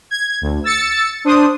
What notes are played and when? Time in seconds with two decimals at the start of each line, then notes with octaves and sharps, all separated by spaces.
0.10 G#6
0.41 D2
0.64 E6 A6 C#7
1.25 D4 C5 D#6